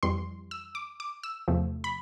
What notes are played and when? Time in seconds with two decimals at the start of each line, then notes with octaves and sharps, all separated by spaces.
0.03 F2 E3 G3 C6
0.51 E6
0.75 D6
1.00 D6
1.23 E6
1.48 E2 C3 F3 A3
1.84 B5